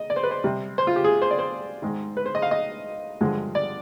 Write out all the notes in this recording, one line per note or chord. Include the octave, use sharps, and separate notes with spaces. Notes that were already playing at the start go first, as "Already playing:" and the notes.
Already playing: D#5
D5
C5
B4
C5
C3 G3
C5
F4
G4
G#4
C5
D5
C5
G#2 D#3 G#3
B4
C5
D#5
F5
D#5
G2 D3 F3 G#3
D5